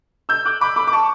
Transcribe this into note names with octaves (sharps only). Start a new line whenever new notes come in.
E6 G6
D6 F#6
B5 D6
B5 D6
D6
A5 C#6